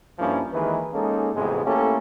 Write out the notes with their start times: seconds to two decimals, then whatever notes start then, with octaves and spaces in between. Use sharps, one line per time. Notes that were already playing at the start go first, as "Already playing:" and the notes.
0.19 G2 F3 A#3 C#4 D4 E4
0.53 D#2 D#3 E3 G#3 B4
0.93 G#3 A#3 C#4 D#4 A4
1.35 A1 F2 G#2 C3 G#3 B3
1.66 A3 A#3 C#4 E4 G4 A4